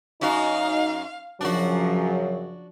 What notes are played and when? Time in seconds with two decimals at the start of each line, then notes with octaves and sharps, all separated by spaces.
0.21 F#2 D#4 F#4 F5
1.41 F#2 C#3 F3 F#3 D4 F#4